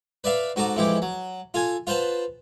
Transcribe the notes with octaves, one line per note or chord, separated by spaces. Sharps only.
B4 D5 E5 F5
G#2 F#4 A4 A#5 D6
F2 E3 G#3 G4 D6
F#3
F4 A4 G#5
F4 B4 C5 F#5 A5